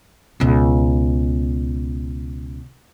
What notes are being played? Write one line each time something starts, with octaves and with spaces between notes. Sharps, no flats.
C#2 B2